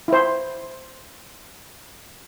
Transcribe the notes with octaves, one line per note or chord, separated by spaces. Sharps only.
E4 C5